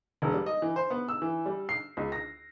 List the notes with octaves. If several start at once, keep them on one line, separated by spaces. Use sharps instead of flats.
E1
G3
D#5
E3
C5
B3
E6
E3
G3
C7
C#2
A#6